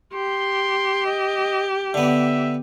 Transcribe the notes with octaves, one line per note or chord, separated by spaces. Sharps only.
G4 C6
D#5
D3 B3 E5